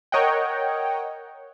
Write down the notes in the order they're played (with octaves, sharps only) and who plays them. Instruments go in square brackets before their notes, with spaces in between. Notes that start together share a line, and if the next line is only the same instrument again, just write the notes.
[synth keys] A#4 C#5 D#5 F#5 G5